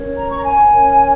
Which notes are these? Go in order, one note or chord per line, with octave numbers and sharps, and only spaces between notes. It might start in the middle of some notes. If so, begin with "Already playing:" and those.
Already playing: C#4 A#4 C#5
A#5
C#6
A#5
G#5
C#4 A#4 C#5